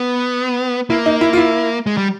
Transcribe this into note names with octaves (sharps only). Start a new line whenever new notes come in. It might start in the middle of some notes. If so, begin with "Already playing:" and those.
Already playing: B3
A#3 E4
D#4
E4
F4
E4
G#3
G3